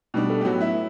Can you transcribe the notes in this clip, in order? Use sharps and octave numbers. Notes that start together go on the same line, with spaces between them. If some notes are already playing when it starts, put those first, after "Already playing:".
B2 G3 D4
A3 A4
G4
A2 F#3 B3 F#4
E4 E5